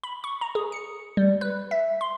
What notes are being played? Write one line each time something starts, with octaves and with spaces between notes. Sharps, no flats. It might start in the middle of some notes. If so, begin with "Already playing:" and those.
B5
C#6
A#5
G#4
C#7
G3
B4
E5
C6